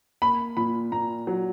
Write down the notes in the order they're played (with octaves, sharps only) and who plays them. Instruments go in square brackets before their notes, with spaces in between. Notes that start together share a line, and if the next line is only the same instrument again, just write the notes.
[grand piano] A#3 [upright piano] B5
[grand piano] A#2 [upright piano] B5
[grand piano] A#2 [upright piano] A#5
[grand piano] F#3